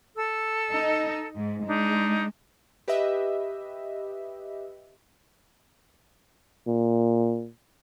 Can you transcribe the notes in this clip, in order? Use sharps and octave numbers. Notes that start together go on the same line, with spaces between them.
A4 E6
D#4
G#2
G#3 D4 D#4
G4 B4 D#5 E5
A#2